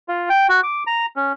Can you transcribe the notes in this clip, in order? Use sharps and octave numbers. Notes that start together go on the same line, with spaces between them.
F4
G5
F#4
D6
A#5
C#4